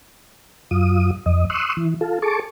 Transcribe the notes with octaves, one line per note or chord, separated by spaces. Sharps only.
F#2 F4 D#6
F2 D#5
C6 C#6 D#6 E6 F#6
E3
F4 A4
G#4 A4 A5 C#6 D6